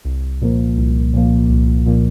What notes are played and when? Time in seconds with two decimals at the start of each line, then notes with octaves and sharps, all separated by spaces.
0.05 C2
0.42 A#2 F3 A#3
0.77 C2
1.13 A#2 F3 A#3
1.49 C2
1.86 A#2 F3 A#3